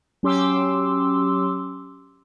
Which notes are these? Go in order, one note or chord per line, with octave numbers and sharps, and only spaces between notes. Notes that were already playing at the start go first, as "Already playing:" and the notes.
F#3 C#4 G4 C6 D6 E6